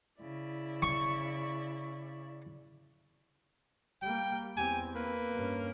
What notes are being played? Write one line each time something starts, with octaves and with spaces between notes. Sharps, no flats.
C#3 E4 D5
C#6
G3 A#3 G5
E2 C4 G4 G#5
A#3 B4
G2 C#4